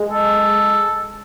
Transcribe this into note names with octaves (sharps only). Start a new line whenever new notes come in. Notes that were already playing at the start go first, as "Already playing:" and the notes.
Already playing: G#3
A4